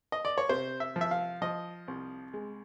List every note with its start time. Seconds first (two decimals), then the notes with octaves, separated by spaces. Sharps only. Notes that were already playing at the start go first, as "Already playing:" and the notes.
0.12 D#5
0.25 D5
0.38 C#5
0.49 C3 C5
0.80 E5
0.96 F3
1.01 E5
1.11 F5
1.41 F3 D#5
1.88 C2
2.34 G#3